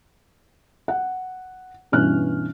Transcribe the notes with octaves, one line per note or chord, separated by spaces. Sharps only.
F#5
G2 B2 E3 C#4 F6 F#6